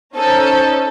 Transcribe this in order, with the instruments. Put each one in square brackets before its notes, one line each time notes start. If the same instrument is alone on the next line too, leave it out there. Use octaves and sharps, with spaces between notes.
[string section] C#4 D#4 A4 [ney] C5